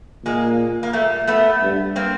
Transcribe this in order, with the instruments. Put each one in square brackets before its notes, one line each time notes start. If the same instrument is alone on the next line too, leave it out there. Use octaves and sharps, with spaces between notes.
[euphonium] A#2 [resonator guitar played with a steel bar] G#3 A#3
[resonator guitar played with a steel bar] A#3
G3 A3
A3 B3
[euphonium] G2
[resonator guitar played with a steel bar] A#3 C4